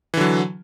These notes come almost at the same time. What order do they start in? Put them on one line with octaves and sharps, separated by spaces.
E3 D3 F#3